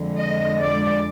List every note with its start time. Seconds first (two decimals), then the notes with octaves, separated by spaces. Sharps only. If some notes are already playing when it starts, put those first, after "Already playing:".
Already playing: F2 D3 G#3
0.17 D#5
0.60 D5